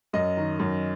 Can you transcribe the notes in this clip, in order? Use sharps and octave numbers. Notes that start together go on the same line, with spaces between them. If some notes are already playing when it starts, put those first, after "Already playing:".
F#2 D#5
D#3
F#2